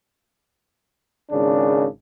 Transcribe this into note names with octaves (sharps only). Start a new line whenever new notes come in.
G#1 C#3 D4